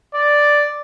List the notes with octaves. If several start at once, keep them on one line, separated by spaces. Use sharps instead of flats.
D5